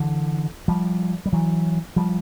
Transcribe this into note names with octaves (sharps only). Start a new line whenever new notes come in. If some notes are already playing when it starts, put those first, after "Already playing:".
Already playing: D3 E3
F3 G3
G3
E3 F#3
F3 G3